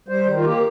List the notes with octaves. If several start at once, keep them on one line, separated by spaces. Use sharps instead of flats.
G3 C5
D#3
F4
A#3 G4